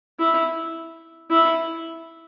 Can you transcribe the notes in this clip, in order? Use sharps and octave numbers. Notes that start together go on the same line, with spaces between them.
E4
E4